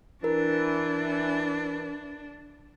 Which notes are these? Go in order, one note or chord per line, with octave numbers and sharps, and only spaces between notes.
E3 D4 A#4